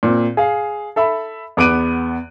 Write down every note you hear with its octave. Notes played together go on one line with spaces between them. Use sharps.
A#2 C4
G#4 F5
A4 E5 B5
E2 B3 D6 F#6 D7 D#7